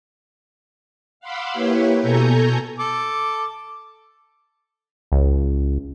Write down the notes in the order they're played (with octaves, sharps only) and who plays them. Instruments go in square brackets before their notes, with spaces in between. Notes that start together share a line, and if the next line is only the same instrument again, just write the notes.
[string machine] F5 F#5 B5 C6 D6 E6
A#3 E4 G4 B4 C#5
B2 A4 G#5 A#5 C#6 G6
[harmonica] A4 D6
[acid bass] C#2